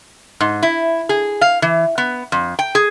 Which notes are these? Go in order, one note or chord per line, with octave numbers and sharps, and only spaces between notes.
G#2
E4
G#4
F5
E3
B3
F2
G5
G#4